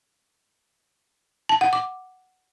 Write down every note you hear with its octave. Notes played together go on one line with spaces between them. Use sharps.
A5
F#5
D6